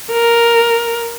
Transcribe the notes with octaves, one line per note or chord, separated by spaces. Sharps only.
A#4